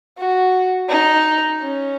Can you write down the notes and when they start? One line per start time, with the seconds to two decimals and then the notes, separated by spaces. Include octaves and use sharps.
0.18 F#4
0.89 D#4
1.61 C#4